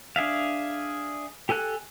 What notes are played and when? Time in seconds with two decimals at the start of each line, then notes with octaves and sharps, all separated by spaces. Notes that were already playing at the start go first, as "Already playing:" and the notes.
0.16 D4 G#4 E5 F5
1.49 G4 A4 G#5 F#6